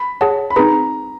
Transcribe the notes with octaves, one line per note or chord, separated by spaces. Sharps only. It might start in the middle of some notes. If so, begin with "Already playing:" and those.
Already playing: B5
G#4 C#5 F#5 A5
B5
C4 D#4 G#4 B4 A#5